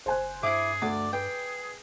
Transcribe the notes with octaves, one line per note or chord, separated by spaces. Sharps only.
F#1 C5 G#5 F#6
G2 E4 G#4 C5 E5 D6
D2 D5
G#4 B4 G5